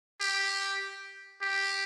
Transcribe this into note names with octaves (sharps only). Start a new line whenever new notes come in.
G4
G4